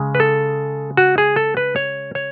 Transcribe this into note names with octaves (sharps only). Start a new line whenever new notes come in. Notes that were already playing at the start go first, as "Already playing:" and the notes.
Already playing: C#3 G#3
B4
A4
F#4
G#4
A4
B4
C#5
C#5